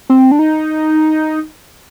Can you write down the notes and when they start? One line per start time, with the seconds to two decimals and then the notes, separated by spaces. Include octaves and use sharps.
0.10 C4
0.31 D4
0.39 D#4